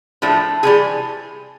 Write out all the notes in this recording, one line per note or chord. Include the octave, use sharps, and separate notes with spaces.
A2 F3 A3 D4
C3 E3 G3 G#4